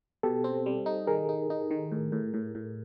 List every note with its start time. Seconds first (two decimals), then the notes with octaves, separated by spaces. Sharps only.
0.23 B2 G4 A4
0.44 C4
0.66 G3
0.86 D#4
1.07 D#3 G#4 A#4
1.29 D#4
1.50 D#4
1.71 D#3
1.92 A2
2.12 A2
2.34 A2
2.55 A2